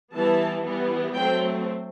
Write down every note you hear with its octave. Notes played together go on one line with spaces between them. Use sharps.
E3 G3 B3 A5
E3 G3 B3
F#3 A3 C4 G5